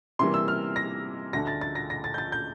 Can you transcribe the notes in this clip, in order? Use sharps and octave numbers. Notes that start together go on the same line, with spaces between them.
C3 E3 G3 A#3 C6
E6
F6
A#6
D2 D3 A3 D4 A#6
A6
A6
A#6
A#6
A6
G6
A6
G6